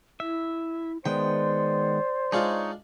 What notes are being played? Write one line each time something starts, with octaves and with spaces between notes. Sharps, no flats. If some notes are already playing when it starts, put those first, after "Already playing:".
E4 E5
D#3 G#3 B3 C5 D5 G5
G#3 D4 D#4 F4 C#5